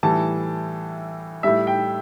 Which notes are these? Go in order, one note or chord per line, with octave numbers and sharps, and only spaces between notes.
A2 E3 G3 A5
A2 G3 E5
G5